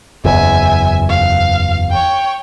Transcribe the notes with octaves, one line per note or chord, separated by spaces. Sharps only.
F#1 E2 E5 G#5
F5
C#5 G5